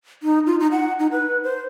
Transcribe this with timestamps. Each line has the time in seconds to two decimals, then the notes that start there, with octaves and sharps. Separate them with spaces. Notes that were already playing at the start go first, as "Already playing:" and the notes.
0.23 D#4
0.47 F4
0.60 D#4
0.72 F#5
0.99 D#4
1.12 B4
1.43 C5